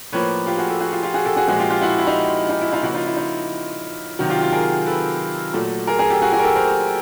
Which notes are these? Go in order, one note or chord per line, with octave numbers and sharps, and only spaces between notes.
A2 F3 A#3 B4 C#5
F4 G4
F#4 G#4
G4 A4
F#4 G#4
F4 G4
F4 G4
F#4 G#4
G4 A4
F#4 G#4
A#2 F3 G#3 F#4 G#4
F4 G4
F4 G4
E4 F#4
E4
D#4
D#4
E4
D#4 F4
C#3 F3 A#3 E4 F#4
D#4 F4
E4
D#4
C3 D#3 F#3
F4 G4
F4 G4
G#4 A#4
A4 B4
A#2 F#3 A3
G#4 A#4
G#4 A#4
G4 A4
F#4 G#4
F#4 G#4
A#4
G4 A4
A#4 C5